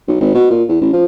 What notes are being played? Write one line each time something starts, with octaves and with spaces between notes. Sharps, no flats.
B1
G#1
B2
A#2
E2
A1
F3